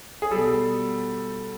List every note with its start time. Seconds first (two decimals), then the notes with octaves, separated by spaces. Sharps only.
0.22 G#4
0.31 B2 G3 A4